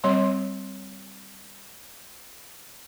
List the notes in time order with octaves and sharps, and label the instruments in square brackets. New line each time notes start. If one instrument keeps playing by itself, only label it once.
[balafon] G3 C4 C#5 C6